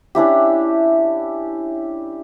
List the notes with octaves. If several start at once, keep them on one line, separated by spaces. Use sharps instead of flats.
C#4 D4 E4 G4